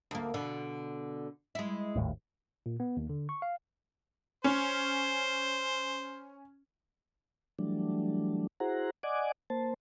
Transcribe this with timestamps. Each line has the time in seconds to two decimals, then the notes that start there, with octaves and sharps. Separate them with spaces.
0.11 D2 A#3
0.34 B2 D3
1.55 G#3 E4
1.96 G#1 D#2 A2
2.66 A#2
2.80 B3
2.97 D#2
3.09 D3
3.29 C#6
3.42 F5
4.44 C#4 C5
7.59 E3 F#3 G3 A3 D4
8.60 E4 F#4 G#4 C5 F#5 A#5
9.03 D5 D#5 F#5 G#5 D6
9.50 A#3 C5 A5